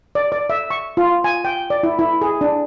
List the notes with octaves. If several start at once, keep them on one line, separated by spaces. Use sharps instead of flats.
D5
D5
E5
C#6
F4
G#5
G5
D5
E4
E4
G#4
D4